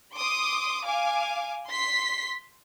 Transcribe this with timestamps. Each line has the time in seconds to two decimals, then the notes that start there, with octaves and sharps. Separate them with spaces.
0.15 C6 D6 D#6
0.84 F5 G#5 D6
1.69 C6 B6 C7